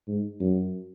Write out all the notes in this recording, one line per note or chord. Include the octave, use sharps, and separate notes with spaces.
G#2
F#2